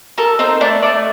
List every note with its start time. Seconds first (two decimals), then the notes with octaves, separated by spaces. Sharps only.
0.18 A4 A#4
0.39 C4 D#4 C5
0.61 A3 D4 D5
0.82 A3 D4 D5